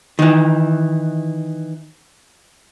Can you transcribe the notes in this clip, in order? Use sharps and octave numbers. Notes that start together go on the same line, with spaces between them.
D#3 E3